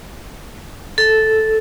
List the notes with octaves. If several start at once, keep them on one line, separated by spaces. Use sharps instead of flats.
A4